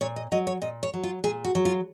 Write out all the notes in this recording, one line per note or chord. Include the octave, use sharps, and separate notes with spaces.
A#2 C#5
D#5
F#3 D#5
C#5
A#2 D#5
C#5
F#3
F4
A#2 G#4
F#4
F#3
F4